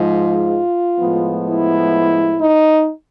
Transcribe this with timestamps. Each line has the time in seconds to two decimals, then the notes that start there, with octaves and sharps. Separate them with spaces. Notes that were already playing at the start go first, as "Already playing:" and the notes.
Already playing: G#2 F3 G#3 F4
0.99 A2 F3 G#3 B3
1.46 E4
2.40 D#4